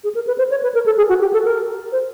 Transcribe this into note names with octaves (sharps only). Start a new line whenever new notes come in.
G#4
A#4
B4
C5
C#5
B4
A#4
A4
G#4
F#4
G4
A4
A#4
C5